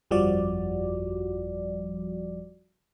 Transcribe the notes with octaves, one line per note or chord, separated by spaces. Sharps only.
G1 F2 F3 G3 F#4 D5